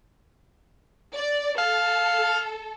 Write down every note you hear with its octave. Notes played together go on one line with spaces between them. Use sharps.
D5
A4 F5